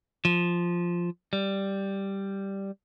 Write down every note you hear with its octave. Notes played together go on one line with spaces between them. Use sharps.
F3
G3